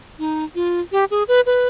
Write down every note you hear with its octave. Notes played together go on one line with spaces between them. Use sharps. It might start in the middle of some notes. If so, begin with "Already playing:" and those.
D#4
F4
G4
G#4
B4
B4